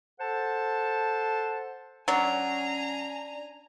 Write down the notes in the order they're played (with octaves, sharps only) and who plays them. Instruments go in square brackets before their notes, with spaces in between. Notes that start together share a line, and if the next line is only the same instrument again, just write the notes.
[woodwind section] A4 C5 F#5 A5
[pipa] F#3 [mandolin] C#4 D4 [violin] G#5 A#5